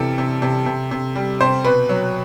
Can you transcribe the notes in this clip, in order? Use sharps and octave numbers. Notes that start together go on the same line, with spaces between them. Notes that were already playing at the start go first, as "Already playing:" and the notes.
Already playing: C3 E3 G3 A4
C3
C3
C3
C3
G3
C3 C5
B2 B4
F#3